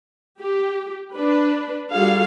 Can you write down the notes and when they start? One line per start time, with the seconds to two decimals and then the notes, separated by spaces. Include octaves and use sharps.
0.40 G4
1.13 D4 B4
1.91 G3 F4 F#4 G#4 A4 F5